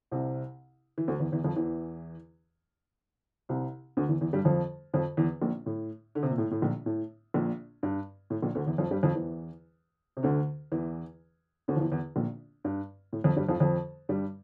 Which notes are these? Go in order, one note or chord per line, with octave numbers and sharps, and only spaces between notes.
C2 C3
E3
D2 D3
E2 E3
E2 E3
F2 F3
E2 E3
C2 C3
D2 D3
E2 E3
E2 E3
G2 G3
F2 F3
F2 F3
E2 E3
A#1 A#2
A2
D3
C3
A#2
A2
A2
A#1 A#2
A2
A#1 A#2
G2
A2
A#1 A#2
D2 D3
E2 E3
F2 F3
G2 G3
F2 F3
E2 E3
C3
D2 D3
E2 E3
D2 D3
F3
E2 E3
E2 E3
A#1 A#2
G2
A2
F2 F3
G2 G3
F2 F3
F2 F3
G2 G3